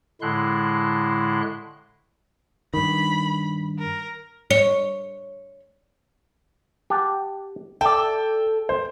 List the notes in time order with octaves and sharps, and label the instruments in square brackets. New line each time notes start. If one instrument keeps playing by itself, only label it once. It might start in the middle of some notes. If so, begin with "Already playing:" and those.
[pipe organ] A2 D3 G#3 E4 C6 F#6
[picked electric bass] G2 D#3 [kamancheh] B5
[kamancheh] A#4
[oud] C#5
[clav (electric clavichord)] G4 F#5 A5
[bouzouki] A4 [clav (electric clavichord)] D5 E5 A5 [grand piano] G5
[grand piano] C5